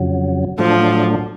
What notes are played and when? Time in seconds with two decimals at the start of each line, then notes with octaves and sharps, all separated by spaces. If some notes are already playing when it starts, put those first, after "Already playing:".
Already playing: F2 C#3 F#3
0.59 A2 F3 F#3 A3 D4